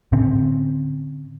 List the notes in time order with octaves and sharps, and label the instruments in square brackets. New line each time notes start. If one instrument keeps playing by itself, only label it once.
[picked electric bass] A2 D3 C4 C#4